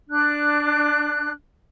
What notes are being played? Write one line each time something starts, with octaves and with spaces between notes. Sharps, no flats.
D4 F#6